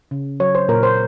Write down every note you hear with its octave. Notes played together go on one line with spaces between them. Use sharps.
C#3
F#3 C#5
C5
A#2 A#4
C5